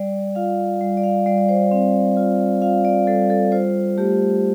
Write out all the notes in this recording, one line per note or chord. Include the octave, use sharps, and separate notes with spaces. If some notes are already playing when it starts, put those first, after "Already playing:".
Already playing: G3 D5
F4 F5
G3
D5
F5
G3 D5
D5
C5
C4
F4
F4 F5
D5
G3 A4
A4
F4 C5
A3 G4